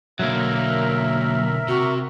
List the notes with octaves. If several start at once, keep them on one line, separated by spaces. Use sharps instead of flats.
B1 D3 F#3 A#3 A#4 E5
C3 F#4